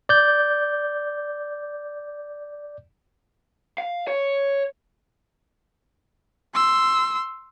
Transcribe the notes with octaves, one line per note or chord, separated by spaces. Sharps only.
D5 G6
F5
C#5
C6 E6